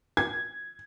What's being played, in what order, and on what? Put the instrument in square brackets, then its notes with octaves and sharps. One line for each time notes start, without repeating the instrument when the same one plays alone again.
[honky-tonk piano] G#6